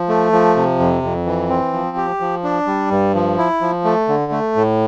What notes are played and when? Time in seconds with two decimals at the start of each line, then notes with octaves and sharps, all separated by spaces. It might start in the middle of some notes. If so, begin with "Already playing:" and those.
Already playing: F3
0.09 A3
0.32 F3
0.56 C3
0.79 F2
1.03 F2
1.26 E3
1.49 C4
1.73 F3
1.97 G4
2.20 F3
2.44 D4
2.67 G3
2.91 G2
3.15 F3
3.38 E4
3.61 F3
3.85 A3
4.08 D3
4.32 A3
4.56 A2